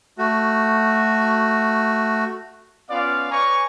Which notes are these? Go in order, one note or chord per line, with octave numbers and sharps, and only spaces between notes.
A3 F#4
B3 C#4 F4 D5 F5
B4 C#5 D5 G#5 A#5 C#6